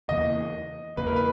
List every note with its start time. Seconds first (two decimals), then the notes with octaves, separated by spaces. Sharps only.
0.09 E2 C#3 E3 A#3 D#5
0.97 E2 C#3 E3 A#3 B4
1.07 A#4
1.16 B4